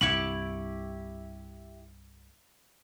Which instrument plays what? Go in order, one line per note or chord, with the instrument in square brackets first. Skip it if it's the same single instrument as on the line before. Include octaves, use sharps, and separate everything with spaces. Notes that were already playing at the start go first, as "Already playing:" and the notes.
[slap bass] C2 G2 [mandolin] E4 G4 C#6 [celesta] F#7